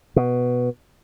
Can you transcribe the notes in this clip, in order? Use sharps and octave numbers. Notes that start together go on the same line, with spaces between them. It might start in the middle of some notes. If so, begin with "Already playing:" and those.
B2